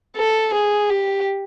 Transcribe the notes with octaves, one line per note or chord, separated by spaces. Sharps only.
A4
G#4
G4